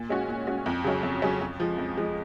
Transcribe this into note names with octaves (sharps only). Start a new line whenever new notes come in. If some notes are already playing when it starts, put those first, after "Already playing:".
Already playing: A#2
G#3 C#4 F#4
A#2
G#3 C#4 F#4
F2
C#3 F#3 C#4
F2
C#3 F#3 C#4
F2
F3 G#3
F2
F3 G#3